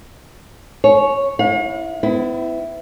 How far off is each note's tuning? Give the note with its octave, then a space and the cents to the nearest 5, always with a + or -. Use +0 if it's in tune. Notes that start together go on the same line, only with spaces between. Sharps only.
C#5 +0 G#5 +40
E4 +0 F5 +45
B3 +45 E4 +0